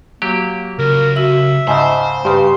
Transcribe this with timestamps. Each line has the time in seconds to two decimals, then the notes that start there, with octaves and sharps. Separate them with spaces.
0.22 F#3 A#3 G4
0.79 C#2 A#4
1.16 F#4 E5 F#7
1.68 G#2 C#3 C5 D#5 G#5 A5
2.25 G2 C#3 G4 B4 C6